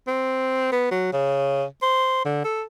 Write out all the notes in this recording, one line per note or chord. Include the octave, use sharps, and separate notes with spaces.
C4
B3
F#3
C#3
C5
D3
A4